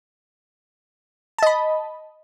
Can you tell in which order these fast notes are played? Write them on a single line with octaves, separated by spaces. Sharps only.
A5 D#5 B5